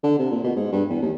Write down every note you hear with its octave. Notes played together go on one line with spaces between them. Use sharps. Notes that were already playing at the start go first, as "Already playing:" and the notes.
D3
C3
A#2
B2
G#2
G2
E2
D#2